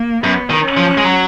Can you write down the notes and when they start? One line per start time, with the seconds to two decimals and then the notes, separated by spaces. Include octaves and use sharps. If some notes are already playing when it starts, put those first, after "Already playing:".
Already playing: A#3
0.24 F#2 B3
0.50 D#3
0.63 C#4
0.77 F3
0.98 G#3
1.04 F#3